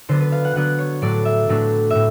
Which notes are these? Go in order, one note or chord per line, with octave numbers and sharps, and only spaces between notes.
D3 F#3 B3 D4 C5
B4
F5
F#5
D3 F#3 B3 D4 F#5
C#5
A2 F#3 A3 D4 D5
E5
A2 F#3 A3 D4
A2 E5